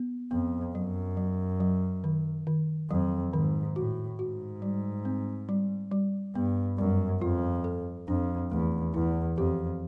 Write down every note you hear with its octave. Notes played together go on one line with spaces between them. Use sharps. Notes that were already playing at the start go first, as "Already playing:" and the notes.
Already playing: B3
F2 B3
F#2 F#3
F#3
F#3
D#3
D#3
F2 F#3
G#2 D#3
A2 F#4
G#2 F#4
G3
C4
G3
G3
G2 B3
F#2 G3
F2 F4
A4
F2 D4
E2 A3
E2 E4
F2 G4